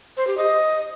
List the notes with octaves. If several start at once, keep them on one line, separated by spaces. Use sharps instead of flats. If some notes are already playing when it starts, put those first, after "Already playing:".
C5
G4
D#5